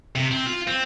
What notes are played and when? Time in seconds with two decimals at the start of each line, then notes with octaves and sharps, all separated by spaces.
0.15 C3
0.31 C4
0.46 F4
0.67 C4